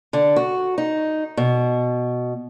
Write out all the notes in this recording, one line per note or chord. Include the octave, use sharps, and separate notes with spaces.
D3
F#4
D#4
B2